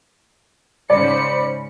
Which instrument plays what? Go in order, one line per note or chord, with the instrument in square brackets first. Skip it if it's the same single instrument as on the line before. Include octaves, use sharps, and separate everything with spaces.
[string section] G#2 C#3 C#7 [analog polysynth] C5 B5 [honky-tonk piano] D5